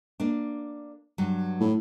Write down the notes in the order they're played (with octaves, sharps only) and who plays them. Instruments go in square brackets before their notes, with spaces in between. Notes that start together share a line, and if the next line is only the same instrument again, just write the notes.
[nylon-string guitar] A#3 D4
G2 F#3
[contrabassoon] A2